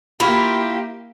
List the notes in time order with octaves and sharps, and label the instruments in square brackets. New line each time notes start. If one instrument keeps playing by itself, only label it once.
[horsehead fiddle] A#3 G4 [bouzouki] E4 F4